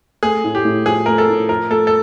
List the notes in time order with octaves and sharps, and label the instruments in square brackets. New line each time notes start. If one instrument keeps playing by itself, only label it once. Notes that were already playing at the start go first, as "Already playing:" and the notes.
[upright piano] A3 [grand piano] G#4
[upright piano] A2
[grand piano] G4
[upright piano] A2
[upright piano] F3 [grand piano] G#4
[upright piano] A3 [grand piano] A#4
[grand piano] A4
[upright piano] A2
[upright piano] F3 [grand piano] A#4
[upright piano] A3 [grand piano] A4
[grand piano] A4